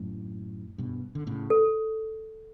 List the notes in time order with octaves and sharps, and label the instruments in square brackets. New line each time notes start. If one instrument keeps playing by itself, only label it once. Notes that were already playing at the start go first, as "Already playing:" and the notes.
Already playing: [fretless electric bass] F#2 A2
G2 B2
D3
A2 C#3
[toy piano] A4